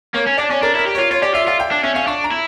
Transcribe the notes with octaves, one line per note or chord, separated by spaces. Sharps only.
A#3 C#5
C#4
D4 D5
C#4 C#5
D4 A#4
E4
A#4
G4
F4 C#5
F4 C#5
G4 D5
F4 E5
F4 F5
G5
D4
C#4 E5
C#4 F5
D4 C#6
A#5
E4